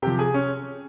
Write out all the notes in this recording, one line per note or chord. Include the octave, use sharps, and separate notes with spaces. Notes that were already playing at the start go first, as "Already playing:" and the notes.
C3 F3 G4 G5
G#4 G#5
C#4 C#5